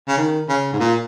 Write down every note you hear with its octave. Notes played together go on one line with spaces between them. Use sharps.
C#3
D#3
C#3
G#2
A#2